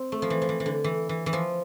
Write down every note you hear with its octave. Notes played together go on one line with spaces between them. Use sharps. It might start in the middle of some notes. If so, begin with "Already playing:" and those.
Already playing: C4
A3
F3
E3
F3
E3
E3
D3
E3
E3
E3
F3